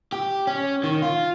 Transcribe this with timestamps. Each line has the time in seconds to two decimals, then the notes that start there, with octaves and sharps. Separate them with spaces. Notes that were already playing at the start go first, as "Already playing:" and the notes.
0.12 G4
0.47 C#4
0.84 D#3
1.02 F4